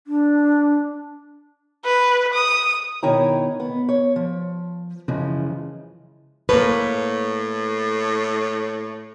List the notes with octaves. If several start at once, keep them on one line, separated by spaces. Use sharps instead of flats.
D4
B4
D#6
B2 D#3 E4 C#5 G5 A#5
B3
C#5
F3
F#2 C#3 E3 F3 G#3
A2 A#3 B4